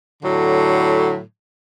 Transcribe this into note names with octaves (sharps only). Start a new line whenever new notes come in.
A2 D3 F#3